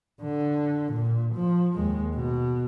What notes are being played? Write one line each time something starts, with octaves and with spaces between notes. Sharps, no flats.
D3
A#2
F3
D#2 G#3
B2